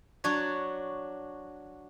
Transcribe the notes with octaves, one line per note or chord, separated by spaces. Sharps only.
F#3 D4 F#4 C#5